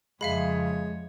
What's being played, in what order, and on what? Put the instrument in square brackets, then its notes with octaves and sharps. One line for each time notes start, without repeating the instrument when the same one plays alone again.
[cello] F2 C#5 [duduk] C#3 [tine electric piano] G#3 [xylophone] E5 F5 B5